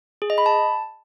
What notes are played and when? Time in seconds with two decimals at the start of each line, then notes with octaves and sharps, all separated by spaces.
0.22 G#4
0.30 D#5
0.38 B5
0.46 A5